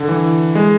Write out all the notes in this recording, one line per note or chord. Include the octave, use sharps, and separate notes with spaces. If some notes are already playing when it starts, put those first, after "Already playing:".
Already playing: D3
E3
G#3